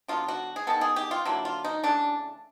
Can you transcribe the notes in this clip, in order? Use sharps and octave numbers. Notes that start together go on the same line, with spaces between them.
D3 F#3 B3 F4
F#4
G#4
D#3 G#3 B3 A4
G#4
G4
F4
D3 F#3 A#3 E4
F4
D#4
C#3 E3 A3 D4